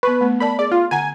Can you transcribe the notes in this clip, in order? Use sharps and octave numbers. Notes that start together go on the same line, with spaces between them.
B3 B4 C#6
A3 B3
A#4 D5 A5 B5
G#4 D5
F4
D3 F#5 G#5 A#5